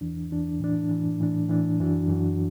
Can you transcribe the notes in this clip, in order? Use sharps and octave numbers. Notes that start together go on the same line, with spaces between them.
E2 E3 D4
E2 E3 D4
A2 E3 D4
A2 E3 D4
A2 E3 D4
A2 E3 D4
F#2 E3 D4 F#4
F#2 E3 D4 F#4